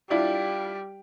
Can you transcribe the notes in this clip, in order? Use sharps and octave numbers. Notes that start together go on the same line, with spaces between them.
G3 D4 E4 F4